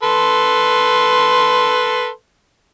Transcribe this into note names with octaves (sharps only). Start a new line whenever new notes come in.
A4 B4 C6